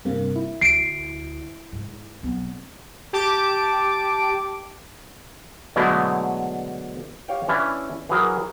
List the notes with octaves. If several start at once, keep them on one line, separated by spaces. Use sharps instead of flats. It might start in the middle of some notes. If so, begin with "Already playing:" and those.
G2 C3 A#3
E4
D2 C7 D7
G#2
B1 B3 C4
G4 A5 D6
B2 D3 F#3 G#3 A3 E4
G4 C#5 F5 G5
E3 C#4 D4 E4 E5
E3 F#3 G#4 A#4